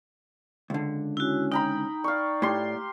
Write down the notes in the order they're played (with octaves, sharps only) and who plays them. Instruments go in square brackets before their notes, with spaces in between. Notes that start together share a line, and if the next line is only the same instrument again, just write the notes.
[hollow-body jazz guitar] C#2 D3
[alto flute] C#4 [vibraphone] E4 F#4
[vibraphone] D#4 [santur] G5 A#5 B5
[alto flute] D5 [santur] F5 C#6
[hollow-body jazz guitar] A2 [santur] G4 C6